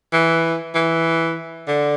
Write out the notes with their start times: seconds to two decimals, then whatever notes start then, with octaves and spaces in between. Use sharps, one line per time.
0.13 E3
0.75 E3
1.67 D3